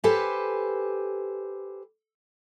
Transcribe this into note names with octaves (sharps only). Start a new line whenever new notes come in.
G4 A4 B4 C5 G#5